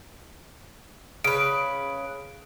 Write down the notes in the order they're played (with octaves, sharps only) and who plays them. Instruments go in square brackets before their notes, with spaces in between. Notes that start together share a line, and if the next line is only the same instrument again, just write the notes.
[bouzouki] C#3 B4 [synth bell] D7